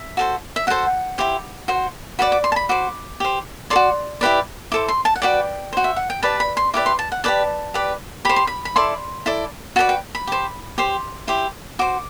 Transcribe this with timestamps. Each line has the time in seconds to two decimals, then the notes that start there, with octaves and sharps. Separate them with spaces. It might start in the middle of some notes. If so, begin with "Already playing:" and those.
Already playing: E5
0.17 F#4 A4 C5
0.56 E5
0.67 F#4 A4 C5 F#5
1.18 E4 G4 C5
1.68 F#4 C5
2.19 F#4 B4 D5 B5
2.32 D6
2.44 C6
2.52 A5
2.56 B5
2.69 F#4 C5 D6
3.20 G4 C5
3.70 A4 D5 C6
3.76 F#4
4.21 E4 G4 B4 D5
4.72 E4 A4 C5 D6
4.88 C6
5.05 A5
5.16 F#5
5.22 F#4 B4 D5 G5
5.73 F#4 C5
5.84 E5
5.96 F#5
6.10 G5
6.23 G4 B4 D5 A5
6.40 B5
6.57 C6
6.74 E4 G4 B4 D5 D6
6.86 C6
6.99 A5
7.12 F#5
7.24 G4 B4 D5 A5
7.74 G4 B4 D5
8.25 G4 C5 B5
8.36 C6
8.47 B5
8.65 B5
8.76 E4 A4 D5 C6
9.26 E4 A4 D5
9.76 F#4 B4 D5 A5
9.89 G5
10.15 B5
10.27 G4 C5
10.78 G4 C5 C6
11.27 E4 G4 C5
11.79 F#4 C5 D6